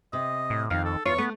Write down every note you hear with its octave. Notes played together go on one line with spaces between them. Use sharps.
C3 D#5
A2
F2 D#3 F5
A4
E2 F4 C#5 C#6
A3 B3